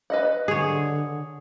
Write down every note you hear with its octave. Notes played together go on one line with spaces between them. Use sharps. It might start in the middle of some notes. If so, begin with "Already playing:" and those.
B4 D#5 F#5
D3 G#4 C#5